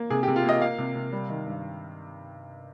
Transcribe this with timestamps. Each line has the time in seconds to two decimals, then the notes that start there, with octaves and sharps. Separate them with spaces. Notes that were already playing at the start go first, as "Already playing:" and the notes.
Already playing: A#3
0.10 C3 G#4
0.23 C3 G4
0.36 F4
0.44 A#3 D#5
0.62 A#3 F5
0.78 C3
0.95 C3
1.12 G3
1.29 D#3
1.47 G2